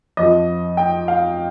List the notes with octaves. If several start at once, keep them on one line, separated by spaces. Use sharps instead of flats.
F2 D#5
F3
G5
F5